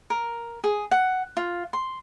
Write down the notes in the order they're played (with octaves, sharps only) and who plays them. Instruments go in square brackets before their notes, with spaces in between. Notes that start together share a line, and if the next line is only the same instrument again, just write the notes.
[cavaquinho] A#4
G#4
F#5
F4
C6